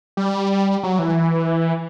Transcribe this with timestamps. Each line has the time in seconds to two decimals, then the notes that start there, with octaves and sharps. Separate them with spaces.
0.17 G3
0.83 F#3
0.99 E3